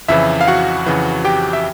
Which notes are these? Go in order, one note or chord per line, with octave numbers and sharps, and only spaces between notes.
F2 C#3 E3 E4 E5
F5
F#4 F#5
F2 C#3 E3
G4 G5
E5